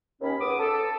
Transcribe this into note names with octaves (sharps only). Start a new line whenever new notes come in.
D#2 C#4 B5
C#2 B3 D6 D#6
A4